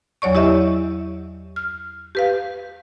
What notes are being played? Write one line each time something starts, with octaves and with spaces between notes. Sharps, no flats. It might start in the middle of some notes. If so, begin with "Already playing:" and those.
E2 F#3 C#5 D5 C#6
E4 G4 D#5 E5
F6
G4 B4 F5